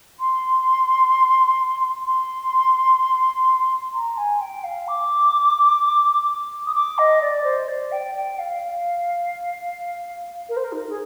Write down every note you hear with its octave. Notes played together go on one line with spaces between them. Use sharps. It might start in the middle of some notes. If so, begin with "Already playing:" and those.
C6
C6
A#5
G#5
G5
F5
D6
D#6
D6
D#5
D5
C5
D5
G5
G5
F5
F5
A#4
C5
A#4
D#4
G#4